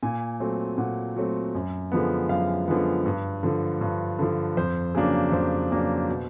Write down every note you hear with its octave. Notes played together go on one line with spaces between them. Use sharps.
A#2 G#5
F#3 A3 C4
A#2 F#5
F#3 A3 C4
F#2
D3 F3 G#3 B3
F#2 F5
D3 F3 G#3 B3
G2
D3 F3
G2
D3 F3
F2 C5
C#3 F#3 A#3 D4
F2 C5
C#3 F#3 A#3 D4
B2